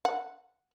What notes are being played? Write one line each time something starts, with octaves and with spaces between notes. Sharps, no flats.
F#5